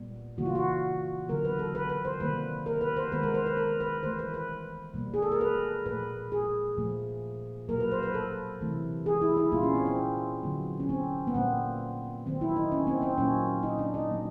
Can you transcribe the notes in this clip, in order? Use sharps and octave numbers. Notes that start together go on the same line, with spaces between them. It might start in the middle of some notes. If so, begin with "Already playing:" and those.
Already playing: A#2 G3 B3
C#3 E3 G3 A#3 F#4
F4
F#4
D3 F#3 B3 A#4
B4
A4
B4
B4
C5
C3 D#3 G3 A#3 B4
A#4
B4
C5
D#3 G#3 B3 B4
A#4
C5
B4
A#4
B4
E3 A3 C5
B4
B4
B2 G3 A#3
G#4
A4
A#4
B4
A#2 F3 A3 B4
G#4
A#2 F3 A3
B2 F#3 A#3 A#4
B4
C5
B4
A4
C3 E3 A3
G#4
E4
E4
A#2 G3 B3 F4
C#4
C4
C4
D3 F#3 B3
C#4
C4
B3
A#2 G3 A#3 C4
D#3 F#3 B3 C4
E4
D#4
C#4
C4
C4
A#2 F#3 A#3 C#4
D#4
D4
D#4
A#2 F#3 B3